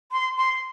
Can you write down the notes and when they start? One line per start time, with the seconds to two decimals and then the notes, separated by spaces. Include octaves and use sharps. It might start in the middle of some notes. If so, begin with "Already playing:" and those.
0.12 C6
0.37 C6